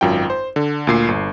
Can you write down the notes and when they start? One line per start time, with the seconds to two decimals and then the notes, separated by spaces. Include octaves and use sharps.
0.01 G#1 F#2 F4 G5
0.30 C5
0.56 D3
0.87 D2 A#2 C7
1.08 G1